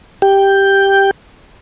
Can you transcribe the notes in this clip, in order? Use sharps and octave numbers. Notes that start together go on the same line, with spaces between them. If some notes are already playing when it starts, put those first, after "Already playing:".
G4 G5